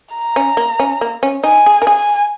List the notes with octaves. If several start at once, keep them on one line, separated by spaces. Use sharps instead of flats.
A#5
C#4
A#3
C#4
A#3
C#4
D#4 G#5
G#4
A#4
G#4 G#5